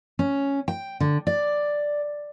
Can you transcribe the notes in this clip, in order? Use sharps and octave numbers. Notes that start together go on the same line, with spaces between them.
C#4
G5
D3
D5